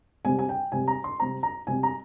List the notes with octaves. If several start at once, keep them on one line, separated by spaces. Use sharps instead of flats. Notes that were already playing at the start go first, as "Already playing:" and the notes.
C3 G3 C4 G#5
G#5
G5
C3 G3 C4 G#5
A#5
C6
C3 G3 C4 A#5
A#5
C3 G3 C4 G#5
A#5